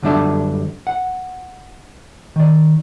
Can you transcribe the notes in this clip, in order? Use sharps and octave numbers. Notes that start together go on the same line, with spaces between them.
F#2 D3 G3 D4 E5 A5
F#5
D#3 D5